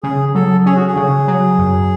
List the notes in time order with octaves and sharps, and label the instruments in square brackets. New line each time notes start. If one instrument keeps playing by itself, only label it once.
[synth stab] C#3 [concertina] G#4
[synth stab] F#3 [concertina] A4
[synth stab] C#4 [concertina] G#4
[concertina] F#4
G#4
[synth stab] C#3
F#3
F#2